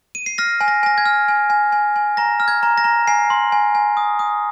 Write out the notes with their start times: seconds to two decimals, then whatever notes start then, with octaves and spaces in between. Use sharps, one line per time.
0.15 D#7
0.26 C7
0.38 F6 A#6
0.61 G#5
0.68 A#6
0.83 G#5 A#6
0.98 G#6
1.05 F6
1.28 G#5
1.50 G#5
1.72 G#5
1.96 G#5
2.17 A#5 A#6
2.40 F6
2.48 G#6
2.63 A#5
2.78 A#6
2.84 A#5
3.07 G#5 C7
3.30 C6
3.52 G#5
3.75 G#5
3.97 D#6
4.19 D#6